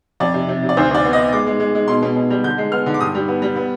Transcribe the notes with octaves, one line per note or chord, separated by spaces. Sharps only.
F2 D5
C3
C3
C3
D5
D2 C5
D2 D5
B3
D#5
B3
G#3 D6
G#3
G#3
G#3
B2 C6
B2
B2
G3
D3 G6
G#3
B3 F6
D3
D6
G2 D#6
G3
B3
G3
B3